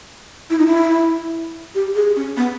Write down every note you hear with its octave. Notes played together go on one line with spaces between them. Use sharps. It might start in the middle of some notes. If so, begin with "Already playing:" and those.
E4
D#4
E4
G4
G#4
C#4
B3